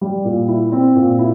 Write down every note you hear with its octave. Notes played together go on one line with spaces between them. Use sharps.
G3
A#2
E4
C4
A#2
E4